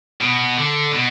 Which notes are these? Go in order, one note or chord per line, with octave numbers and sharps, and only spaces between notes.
B2
D3
B2